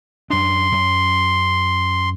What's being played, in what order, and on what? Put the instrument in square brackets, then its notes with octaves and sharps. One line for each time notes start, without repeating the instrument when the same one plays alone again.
[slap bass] F#2 D4 [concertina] C6
[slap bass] F#2